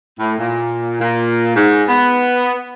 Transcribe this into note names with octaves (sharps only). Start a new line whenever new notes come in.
A2
A#2
A#2
G#2
B3